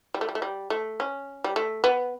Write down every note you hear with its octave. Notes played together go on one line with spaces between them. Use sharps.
G3
A3
G3
A3
G3
A3
C#4
G3
A3
B3